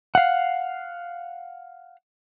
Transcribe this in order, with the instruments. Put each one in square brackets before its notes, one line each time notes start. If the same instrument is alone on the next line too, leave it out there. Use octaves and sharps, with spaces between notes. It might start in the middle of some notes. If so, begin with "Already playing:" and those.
[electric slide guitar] F5 F#5